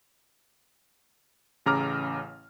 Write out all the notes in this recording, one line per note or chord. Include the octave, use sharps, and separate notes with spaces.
A1 C#3 A#5 D6 F6